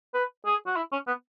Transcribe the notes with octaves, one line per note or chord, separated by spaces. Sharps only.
B4
G#4
F#4
E4
C#4
B3